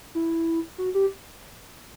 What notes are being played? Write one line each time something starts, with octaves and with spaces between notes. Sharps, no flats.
E4
F#4
G4